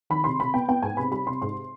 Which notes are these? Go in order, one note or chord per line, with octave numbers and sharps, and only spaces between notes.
D#3 B5
C3 C6
C3 B5
B3 G5
B3 G5
G#2 G#5
C3 B5
G3 B5
C3 C6
G#2 C6